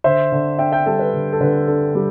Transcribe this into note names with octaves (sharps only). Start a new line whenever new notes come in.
D3 C5 E5
D3
D4 E5 G5
E5 G5
G3 A4
B4
D3
A4
D3 B4
D4 A4
G3